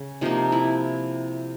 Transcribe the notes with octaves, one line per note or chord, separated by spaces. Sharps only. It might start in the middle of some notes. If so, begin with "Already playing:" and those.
Already playing: C#3
C3 F3 A#3 D#4
E4